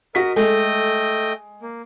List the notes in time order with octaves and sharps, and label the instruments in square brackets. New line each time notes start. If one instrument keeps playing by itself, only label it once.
[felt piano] F#4 B6 [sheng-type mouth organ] A#4 D#5
[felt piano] G#3 [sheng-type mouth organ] A3 D#5 G5 [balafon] A4
[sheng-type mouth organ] A#3